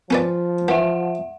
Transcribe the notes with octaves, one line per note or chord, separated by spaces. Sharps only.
F3 C#4 B4 D5
E3 E5 F#5